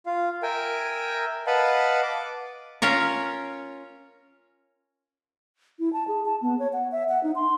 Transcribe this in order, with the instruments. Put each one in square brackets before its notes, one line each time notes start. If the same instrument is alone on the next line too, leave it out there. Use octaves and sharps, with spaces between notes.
[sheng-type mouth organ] F4 F5
A#4 E5 G5 G#5
B4 D#5 F5 F#5 A5 B5
D6
[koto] C#4 F4 A#4 C#5
[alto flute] E4
A5
G#4
A5
B3
C#5
F#5
E5
F#5
D#4
C6